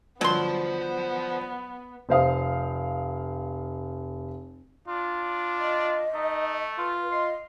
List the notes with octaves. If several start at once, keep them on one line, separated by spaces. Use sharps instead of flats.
G2 D3 F3 F#3 B3 C5 A5 C6
F1 C5 F5 D#6
D4 F4
D#5
A3 D#4
F4 B4
D#5 C6